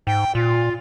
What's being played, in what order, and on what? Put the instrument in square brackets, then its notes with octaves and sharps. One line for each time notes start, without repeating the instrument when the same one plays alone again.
[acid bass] G#2 [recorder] G5
[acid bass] A#2 [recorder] F4